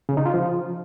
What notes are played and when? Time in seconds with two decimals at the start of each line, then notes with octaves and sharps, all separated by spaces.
0.09 C#3
0.17 D#4
0.26 F4
0.34 F3